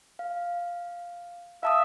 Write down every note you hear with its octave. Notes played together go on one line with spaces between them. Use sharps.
F5
E5 F5 A5 D#6